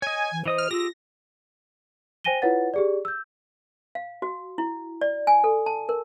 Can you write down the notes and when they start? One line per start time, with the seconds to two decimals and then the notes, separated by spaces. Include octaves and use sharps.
0.02 C#5 D#5 G#5
0.32 E3
0.46 E3 C5 D#5 D#6
0.58 F6
0.71 F4 G4 G#4 E6 A#6
2.24 C5 G5 G#5 A#6 D#7 G7
2.42 E4 F4 B4 C#5 F#5 A6
2.74 G4 G#4 D5
3.05 E6 G6
3.95 F5
4.22 F#4
4.58 E4
5.01 D5
5.27 G#5
5.44 A4
5.66 A5
5.89 A#4